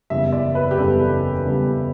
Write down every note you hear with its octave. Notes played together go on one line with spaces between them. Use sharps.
F#1 E2 C#3 G3 E5
D5
B4
G4
F#1 E2 C#3 G3 A4
F#1 E2 C#3 G3